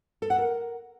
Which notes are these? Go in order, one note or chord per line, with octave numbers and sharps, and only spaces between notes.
A4
F#5
A#4